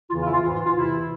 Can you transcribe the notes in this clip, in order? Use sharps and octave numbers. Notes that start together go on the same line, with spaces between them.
E2 C#3 E3 F4
F4
E4
F4
G#2 E3 F4
F4
F4
E2 C3 E3 E4